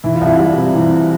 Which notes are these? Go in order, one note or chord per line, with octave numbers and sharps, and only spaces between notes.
E3 E4
F4
C2 E4
G3
C3
E3